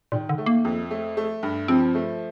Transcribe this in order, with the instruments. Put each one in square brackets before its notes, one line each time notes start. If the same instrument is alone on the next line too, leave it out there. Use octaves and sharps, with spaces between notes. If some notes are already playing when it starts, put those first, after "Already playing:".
[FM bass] A#2 [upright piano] D#3
[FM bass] D3
[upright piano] A3
[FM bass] A#3
[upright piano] F2
A3
A3
G2
[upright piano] F3 [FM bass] C4
[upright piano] A3